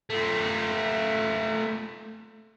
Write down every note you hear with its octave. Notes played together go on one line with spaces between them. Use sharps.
A3 F4